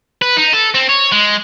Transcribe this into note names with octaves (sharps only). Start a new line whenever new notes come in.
B4
D#4
A4
C4
C#5
G#3